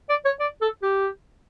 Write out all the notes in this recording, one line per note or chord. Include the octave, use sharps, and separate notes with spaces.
D5
C#5
D5
A4
G4